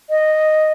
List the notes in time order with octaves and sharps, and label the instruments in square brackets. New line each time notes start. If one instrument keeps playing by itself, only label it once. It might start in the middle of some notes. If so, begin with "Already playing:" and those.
[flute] D#5